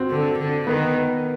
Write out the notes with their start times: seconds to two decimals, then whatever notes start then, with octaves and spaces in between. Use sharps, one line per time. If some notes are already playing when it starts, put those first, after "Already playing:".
Already playing: C4 F#4
0.10 D3
0.38 D3
0.67 D#3 B3